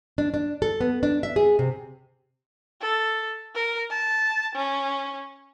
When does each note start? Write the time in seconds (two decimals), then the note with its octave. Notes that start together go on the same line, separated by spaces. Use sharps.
0.18 D4
0.34 D4
0.62 A4
0.81 B3
1.03 D4
1.23 E5
1.36 G#4
1.59 C3
2.81 A4
3.55 A#4
3.90 A5
4.55 C#4